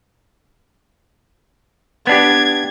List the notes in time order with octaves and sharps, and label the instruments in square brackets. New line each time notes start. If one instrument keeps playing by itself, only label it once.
[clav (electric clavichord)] B3 D4 G4 [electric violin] G#6